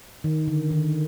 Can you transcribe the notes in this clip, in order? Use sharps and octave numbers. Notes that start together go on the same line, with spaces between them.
D#3
D3
D#3